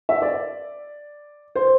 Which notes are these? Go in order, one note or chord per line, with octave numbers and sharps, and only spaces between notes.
E5
D5
C5